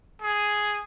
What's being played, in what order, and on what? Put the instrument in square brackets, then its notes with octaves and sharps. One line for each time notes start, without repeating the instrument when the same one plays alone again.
[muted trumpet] G#4